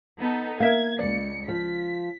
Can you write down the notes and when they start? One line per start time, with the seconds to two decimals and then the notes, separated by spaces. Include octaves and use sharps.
0.19 B3 D#4 A4
0.60 A#3 A#4 E5 F5 G#6
0.99 C#2 D5 C#7
1.48 F3 B6